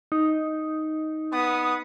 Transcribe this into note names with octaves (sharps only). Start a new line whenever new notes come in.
D#4
B3 D#6